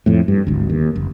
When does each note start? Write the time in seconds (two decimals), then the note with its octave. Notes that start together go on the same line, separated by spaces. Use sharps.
0.06 F2 A2
0.28 G2
0.47 G#1 D2
0.70 D#2
0.96 F#1